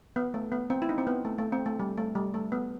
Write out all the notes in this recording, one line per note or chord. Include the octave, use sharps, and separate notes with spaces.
B3
A3
B3
C4
E4
D#4
C4
B3
A3
A3
C4
A3
G3
A3
G3
A3
B3